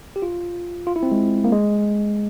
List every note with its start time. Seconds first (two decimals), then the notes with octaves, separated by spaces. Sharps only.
0.16 G4
0.22 F4
0.87 F4
0.96 E4
1.03 C4
1.12 G#3
1.44 A#3
1.52 G#3